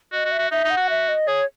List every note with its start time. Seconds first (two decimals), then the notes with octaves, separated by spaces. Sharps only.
0.12 F#4 D#5
0.25 F#4
0.32 E5
0.39 F#4
0.51 D#4 E5
0.64 D#4
0.70 F#5
0.77 F#4
0.90 E5
1.08 D#5
1.28 G#4 C#5